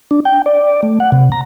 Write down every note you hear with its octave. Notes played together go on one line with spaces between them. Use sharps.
D4
G5
D5
A3
F#5
C3
A#5